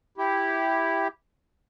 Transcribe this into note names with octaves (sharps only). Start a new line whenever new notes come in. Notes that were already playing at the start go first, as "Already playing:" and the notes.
E4 G4